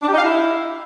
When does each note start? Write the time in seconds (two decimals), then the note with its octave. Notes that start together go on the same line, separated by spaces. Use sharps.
0.02 D4
0.07 G4
0.12 D#4
0.18 F5
0.23 E4